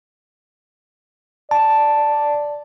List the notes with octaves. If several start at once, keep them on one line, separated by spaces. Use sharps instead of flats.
D5 A5